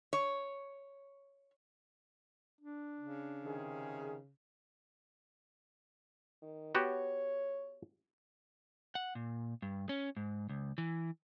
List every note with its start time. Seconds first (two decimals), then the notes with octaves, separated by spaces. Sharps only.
0.13 C#5
2.61 D4
3.00 C#3
3.44 C3 D#3 G#4
6.42 D#3
6.75 B3 F#4 G4 C#5
8.95 F#5
9.15 A#2
9.62 G2
9.89 C#4
10.17 G#2
10.49 C#2
10.78 E3